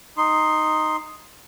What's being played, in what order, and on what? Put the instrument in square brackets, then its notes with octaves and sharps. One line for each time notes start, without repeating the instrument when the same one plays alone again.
[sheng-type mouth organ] D#4 C6